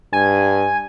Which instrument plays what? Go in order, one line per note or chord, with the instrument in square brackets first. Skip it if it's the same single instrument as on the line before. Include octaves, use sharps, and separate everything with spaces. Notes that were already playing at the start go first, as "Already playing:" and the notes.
[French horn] G2 [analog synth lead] G#5